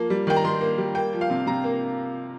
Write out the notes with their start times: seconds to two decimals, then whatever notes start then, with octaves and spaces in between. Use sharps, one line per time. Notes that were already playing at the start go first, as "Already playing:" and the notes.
Already playing: F3 A#3
0.10 G3
0.27 D#3 G5
0.36 A#5
0.44 D#3 C6
0.61 A#3
0.78 G3
0.95 A#3 G5
1.13 F3
1.21 F5
1.30 C3
1.47 C3 A#5
1.64 A#3